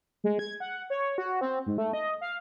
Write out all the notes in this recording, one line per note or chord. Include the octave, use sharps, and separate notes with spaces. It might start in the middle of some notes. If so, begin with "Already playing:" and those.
G#3
G#6
F#5
C#5
F#4
C4
G#2
A3
D#5
F5